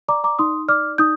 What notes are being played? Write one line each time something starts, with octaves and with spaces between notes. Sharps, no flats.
D5 A#5 D6
A#5 D6
D#4 C6 D#6
D5 D6 F6
D#4 D#6 G6